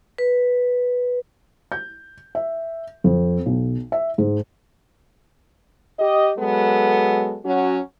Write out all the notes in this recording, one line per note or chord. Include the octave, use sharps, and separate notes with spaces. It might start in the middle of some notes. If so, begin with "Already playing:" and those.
B4
G6
E5
F2
B1
E5
G#2
G4 D#5
F#3 G#3 B3 A4
F#3 C#4 F#4